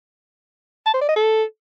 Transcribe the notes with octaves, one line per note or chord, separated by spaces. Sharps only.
A5
C5
D5
D#5
A4